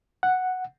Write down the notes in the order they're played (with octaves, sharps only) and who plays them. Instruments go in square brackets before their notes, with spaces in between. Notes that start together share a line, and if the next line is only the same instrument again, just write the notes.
[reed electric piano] F#5